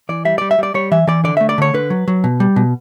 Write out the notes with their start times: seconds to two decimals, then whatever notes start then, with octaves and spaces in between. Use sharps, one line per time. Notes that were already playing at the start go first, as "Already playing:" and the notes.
0.09 E3 D5
0.25 G3 E5
0.38 G3 D5
0.51 E5
0.59 G3 D5
0.74 G3 C#5
0.92 E3 E5
1.07 E3 D5
1.24 D3 D5
1.37 A3 E5
1.49 D5
1.58 D3 C#5
1.74 D3 B4
1.90 F#3
2.08 F#3
2.24 B2
2.40 G3
2.56 B2